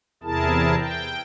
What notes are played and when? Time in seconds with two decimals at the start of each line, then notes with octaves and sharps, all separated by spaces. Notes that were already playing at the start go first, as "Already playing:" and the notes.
0.23 E2 C3 E4 G#4 A#4 A5
0.79 G5